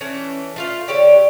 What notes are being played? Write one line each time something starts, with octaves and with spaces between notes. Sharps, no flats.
E3 A3 C#4 A5
A3 F4 F5
D3 G4 A4 C#5